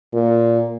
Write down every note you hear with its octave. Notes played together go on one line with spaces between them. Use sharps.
A#2